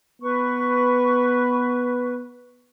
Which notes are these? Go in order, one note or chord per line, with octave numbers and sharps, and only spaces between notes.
B3 B4 C#6